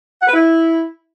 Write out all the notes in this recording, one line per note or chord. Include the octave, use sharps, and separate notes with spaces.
F#5
B4
E4